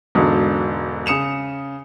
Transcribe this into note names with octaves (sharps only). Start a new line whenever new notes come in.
E1 G#2 B2 D3
C#3 D#6 C#7 E7 F7